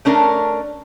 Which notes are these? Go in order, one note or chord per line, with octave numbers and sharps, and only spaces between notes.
A3 C#4 D4 A#4